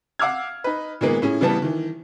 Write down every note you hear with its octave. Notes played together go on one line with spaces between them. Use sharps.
F5 F#5 D6 E6 F6 G#6
D#4 B4
A#2 D#3 G#3 A#3 B3
A2 C#4 G#4
C#3 E3 G3 B3 A5
D#3 E3